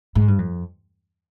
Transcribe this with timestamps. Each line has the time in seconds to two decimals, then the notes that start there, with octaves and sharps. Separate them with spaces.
0.15 G#2
0.28 G2
0.39 F2